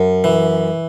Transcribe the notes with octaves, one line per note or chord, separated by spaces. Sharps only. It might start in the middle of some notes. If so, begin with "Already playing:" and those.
Already playing: F#2
E3